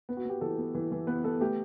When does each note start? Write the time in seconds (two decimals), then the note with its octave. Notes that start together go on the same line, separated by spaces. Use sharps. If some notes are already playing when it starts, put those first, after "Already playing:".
0.09 B3
0.17 F#4
0.25 B3 G4
0.41 E3 A4
0.58 B3
0.74 E3
0.92 E3
1.07 B3 B4
1.24 B3 A4
1.40 A3 G4